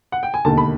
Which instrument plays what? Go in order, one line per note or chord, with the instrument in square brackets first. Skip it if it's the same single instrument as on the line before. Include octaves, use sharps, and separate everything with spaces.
[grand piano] F#5
G5
G#5
E1 D#2 D3 A5
B5